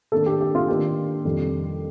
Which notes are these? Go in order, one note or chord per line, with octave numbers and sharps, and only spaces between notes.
D#3 A#3 D4 A4
G4
G4
F4
D#3 A#3 D4 G4
F2 C3 D#3 G3